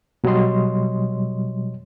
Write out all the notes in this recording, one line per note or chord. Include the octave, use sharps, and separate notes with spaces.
B2 F#3 G3 C#5 D#5 C6